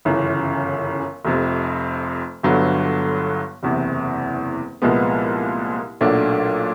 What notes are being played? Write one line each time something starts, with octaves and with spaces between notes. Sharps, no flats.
G1 F#2 C#3 E3
F1 F2 C3
G1 G2 D3 F#3 B3
F#1 E2 C3
C2 A#2 F3 G#3 B3
B1 A#2 F#3 A3 D4